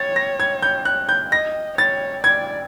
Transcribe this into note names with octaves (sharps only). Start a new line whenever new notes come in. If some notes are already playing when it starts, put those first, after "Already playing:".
Already playing: C#5 A6
A#6
G#6
G6
F#6
G6
D#5 A#6
C#5 A6
D5 G#6